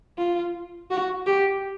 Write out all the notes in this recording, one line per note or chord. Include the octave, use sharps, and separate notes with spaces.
F4
F#4
G4